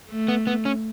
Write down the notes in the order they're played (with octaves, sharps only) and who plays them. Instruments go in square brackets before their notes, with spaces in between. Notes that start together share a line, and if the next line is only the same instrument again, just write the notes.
[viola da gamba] A3
[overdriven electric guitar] B3
B3
C#4